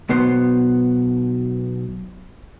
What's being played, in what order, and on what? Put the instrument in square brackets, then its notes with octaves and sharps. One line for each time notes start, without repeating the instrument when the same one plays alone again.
[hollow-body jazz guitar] B1 B2 B3 C5